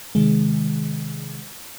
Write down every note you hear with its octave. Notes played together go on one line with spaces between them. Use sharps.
C3 D#3 G#3